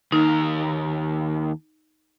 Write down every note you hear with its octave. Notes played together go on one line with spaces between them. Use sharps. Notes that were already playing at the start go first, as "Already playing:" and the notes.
D#2 D#4 A#4